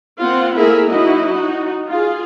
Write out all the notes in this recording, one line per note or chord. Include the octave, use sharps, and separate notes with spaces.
A#3 C4 F4 F#5
A3 A#3 E4 G#4 A#4 E5
F#3 D#4 E4 F#4 D#5
D#4 F#4
F4 G#4